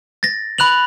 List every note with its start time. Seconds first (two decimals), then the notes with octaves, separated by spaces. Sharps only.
0.23 A6 A#6
0.58 B5 F#6 F7 F#7